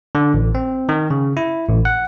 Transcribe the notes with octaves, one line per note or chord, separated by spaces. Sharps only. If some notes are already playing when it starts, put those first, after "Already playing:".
D3
A1
C4
D#3
C#3
E4
A1
F#5